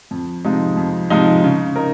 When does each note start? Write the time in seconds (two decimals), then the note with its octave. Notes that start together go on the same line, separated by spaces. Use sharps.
0.11 F2
0.45 C3 F3 G#3 D#4
0.77 F2
1.10 C3 F3 G#3 D#4
1.44 C#3
1.76 D#4 A#4